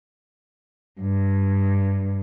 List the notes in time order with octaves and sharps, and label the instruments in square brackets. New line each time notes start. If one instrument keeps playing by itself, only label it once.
[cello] G2